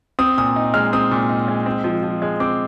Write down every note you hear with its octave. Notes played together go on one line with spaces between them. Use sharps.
C4 D#6
A#2 D#6
D#4
G#3 F6
C4 D#6
A#2
D#4
G#3
C4
F3
F3
G#3
C4 D6